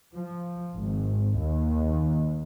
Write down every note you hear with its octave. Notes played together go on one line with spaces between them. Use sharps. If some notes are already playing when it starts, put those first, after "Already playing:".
F3
G#1
D#2